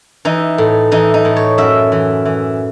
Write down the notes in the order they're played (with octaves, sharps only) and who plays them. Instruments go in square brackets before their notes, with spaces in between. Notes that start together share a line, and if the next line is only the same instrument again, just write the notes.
[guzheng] E3 D#4
A2
E3 D#4
D#4
A2
C#5
F#2 E5
E3
E3